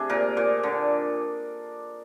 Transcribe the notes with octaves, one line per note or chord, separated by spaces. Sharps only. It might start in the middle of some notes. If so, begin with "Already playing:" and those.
Already playing: C3 D4 G#4
A#2 A#4
A#2
D3